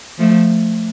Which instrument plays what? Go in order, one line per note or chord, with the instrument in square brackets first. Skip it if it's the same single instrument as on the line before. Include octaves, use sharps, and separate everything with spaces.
[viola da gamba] F3 A3